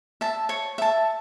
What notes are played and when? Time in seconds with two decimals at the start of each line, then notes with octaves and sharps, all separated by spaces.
0.21 E5 A5
0.49 C#5
0.78 E5 A5